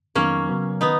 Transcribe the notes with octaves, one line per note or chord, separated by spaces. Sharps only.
F2 D#3 F#3 A#3 B3 C#4 D#4
C#3 F#3 B3
D#3 B3 D#4